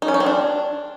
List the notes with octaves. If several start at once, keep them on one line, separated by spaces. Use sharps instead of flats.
D#4
C#4
D#4
C4
D4